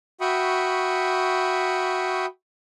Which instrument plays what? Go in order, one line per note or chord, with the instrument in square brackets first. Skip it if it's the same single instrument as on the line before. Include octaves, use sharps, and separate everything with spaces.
[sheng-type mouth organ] F#4 E5 G5 B5 C#6 D#6